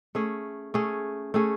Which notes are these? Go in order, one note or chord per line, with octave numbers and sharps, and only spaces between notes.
A3 C#4 G#4
A3 C#4 G#4
A3 C#4 G#4